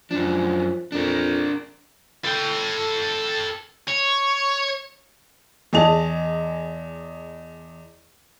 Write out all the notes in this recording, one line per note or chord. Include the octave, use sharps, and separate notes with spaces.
F#2 F3 D4
F2 D4 A#4
A4 G5
C#5
E2 G#4 D#5 A5 F7